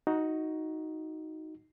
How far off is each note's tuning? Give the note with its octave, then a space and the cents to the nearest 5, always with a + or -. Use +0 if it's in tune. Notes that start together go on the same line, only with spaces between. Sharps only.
D#4 +10 F#4 +0